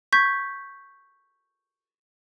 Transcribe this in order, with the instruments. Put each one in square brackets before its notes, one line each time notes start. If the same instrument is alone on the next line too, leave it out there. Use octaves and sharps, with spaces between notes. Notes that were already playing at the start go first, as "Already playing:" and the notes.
[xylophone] C#6 G6 G#6 B6